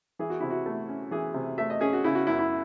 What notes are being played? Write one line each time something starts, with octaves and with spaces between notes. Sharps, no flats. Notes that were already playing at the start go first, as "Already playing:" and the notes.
E3 G#4
F#4
C3 E4
F#4
A3
C#4
E3 G#4
C3
A3 E5
D#5
C#4 G#4
F#4
C#3 E4
F#4
F#2 E4
E4